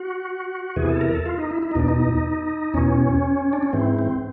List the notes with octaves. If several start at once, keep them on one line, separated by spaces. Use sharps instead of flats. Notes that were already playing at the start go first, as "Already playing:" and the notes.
Already playing: F#4
E2 C3 E3 G#4
A4
A#4
A4
F4
D#4
E4
E4
D#4
E2 B2 D4
D#4
E2 B2 C#4
D4
C#4
G#2 E3 C4
C4